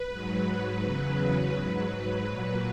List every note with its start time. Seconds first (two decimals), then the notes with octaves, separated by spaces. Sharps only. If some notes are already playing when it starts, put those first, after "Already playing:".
Already playing: B4
0.09 G#2 F#3
0.82 E2 C#3 F#3
1.55 G#2 F#3 B4
2.29 A#2 F#3